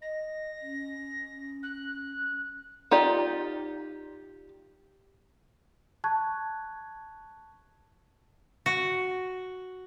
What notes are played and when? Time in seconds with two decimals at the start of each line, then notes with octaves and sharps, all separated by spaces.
0.02 D#5 A#6
0.62 C#4
1.63 F#6
2.91 D#4 F4 G4 D5
6.04 A5 C#6 F#6 G#6
8.66 F#4